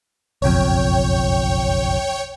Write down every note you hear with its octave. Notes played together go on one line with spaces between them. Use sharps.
F#1 B1 F2 C#5 G5